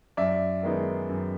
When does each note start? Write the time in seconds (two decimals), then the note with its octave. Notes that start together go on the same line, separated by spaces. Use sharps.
0.17 F#2 D5 E5
0.63 D#3 G#3 B3 D#4
1.09 F#2